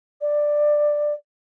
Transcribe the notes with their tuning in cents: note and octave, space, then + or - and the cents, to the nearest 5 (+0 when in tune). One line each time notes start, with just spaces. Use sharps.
D5 +10